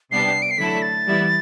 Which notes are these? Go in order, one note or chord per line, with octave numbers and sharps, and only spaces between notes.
C3 G3 B3 D4 G4 C7
D7
C7
D3 F#3 A3 E4 A4 B6
A6
E3 G3 B3 E4